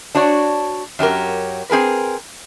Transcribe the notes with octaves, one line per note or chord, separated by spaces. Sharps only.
D4 F#4 C#5 D5
F#2 F#3 G4 A#4
C4 G#4 A#4 B4